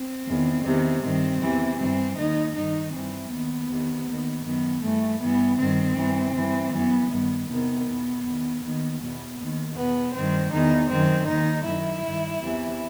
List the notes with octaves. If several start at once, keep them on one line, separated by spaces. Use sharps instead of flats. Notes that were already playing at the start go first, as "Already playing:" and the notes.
Already playing: C4
E2 D#3
E2 C3 D#3
G2 D#3 C4
E2 C3 E3
G2 E3 C4
D#2 D#3 D#4
G2 D#3 D#4
G2 E3 C4
D#2 D#3 B3
E2 C3 D#3
D#2 D#3
F#2 D#3 B3
G2 E3 A3
G2 E3 B3
G2 D#3 C4
G2 E3
G2 E3
F#2 E3 B3
G2 D#3 B3
E2 C3 D#3 B3
E2 B2
E2 D#3
D#2 D#3 B3
E2 B2 B3
D#2 D#3
E2 B2 B3
G2 D#3 C4
E2 D#3 D#4
F#2 D#3 C4
D#2 D#3 D#4
F#2 D#3 E4
G2 D#3
E2 C3 E3